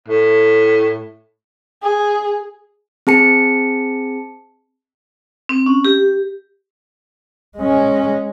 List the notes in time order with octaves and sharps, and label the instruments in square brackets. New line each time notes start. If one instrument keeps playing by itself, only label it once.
[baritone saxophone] A2
[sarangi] G#4
[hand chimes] C4 G#4 A5 C#7
[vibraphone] C4
C#4
G4
[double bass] G#3 C#4